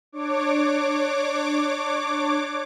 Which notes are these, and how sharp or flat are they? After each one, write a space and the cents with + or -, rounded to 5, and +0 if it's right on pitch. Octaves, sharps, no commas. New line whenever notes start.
D4 +25 C#5 -10 D6 +0